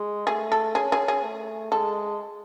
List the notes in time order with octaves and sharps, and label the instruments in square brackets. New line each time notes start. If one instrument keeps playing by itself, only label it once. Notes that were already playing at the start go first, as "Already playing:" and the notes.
Already playing: [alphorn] G#3
[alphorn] A3 [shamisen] G#4
[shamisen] A4
[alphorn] C#4 [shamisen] G#4
[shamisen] G#4
G#4
[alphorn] A3
[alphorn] G#3 [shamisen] A4